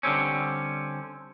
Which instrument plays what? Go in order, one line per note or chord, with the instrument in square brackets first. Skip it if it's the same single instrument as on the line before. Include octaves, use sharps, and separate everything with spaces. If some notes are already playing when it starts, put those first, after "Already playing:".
[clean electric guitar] D3 G3 C4 C#4